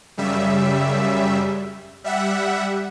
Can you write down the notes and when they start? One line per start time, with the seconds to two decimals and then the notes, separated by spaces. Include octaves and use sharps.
0.17 F#2 C#3 G3 E5
2.04 G3 E5 F#5